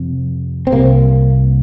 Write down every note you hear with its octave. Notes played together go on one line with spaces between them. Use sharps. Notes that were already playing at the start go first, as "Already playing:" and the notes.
Already playing: F2 C3
C4
C2 C3 A#3